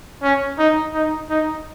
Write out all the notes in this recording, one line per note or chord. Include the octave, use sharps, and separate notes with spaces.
C#4
D#4
D#4
D#4